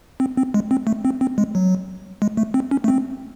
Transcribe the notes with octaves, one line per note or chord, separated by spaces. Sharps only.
C4
C4
G#3
C4
A3
C4
C4
G#3
F#3
G#3
A3
C4
C#4
A3
C4